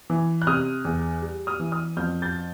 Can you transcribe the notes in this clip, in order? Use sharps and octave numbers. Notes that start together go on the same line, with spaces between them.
E3
F#6
C3 D#6 F6
E2
G3
D#6 F6
E3
D#6 F6
F2 F6 G6
G6 A6